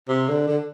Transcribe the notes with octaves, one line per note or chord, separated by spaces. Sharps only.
C3
D3
D3